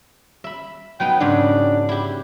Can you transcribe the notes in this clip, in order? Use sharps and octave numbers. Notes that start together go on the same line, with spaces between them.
E5 B5
F#3 B3 D#4 G5
G#2 C#3 F#3 D4
E4 G4